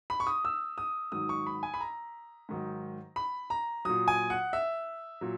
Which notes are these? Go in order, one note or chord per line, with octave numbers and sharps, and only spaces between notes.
B5
C#6
D#6
E6
D#6
G#2 D#3 F#3 D#6
C#6
B5
G#5
B5
A#5
G#2 D#3 F#3
B5
A#5
A#2 F#3 D#6
G#5
F#5
E5
A#2 F#3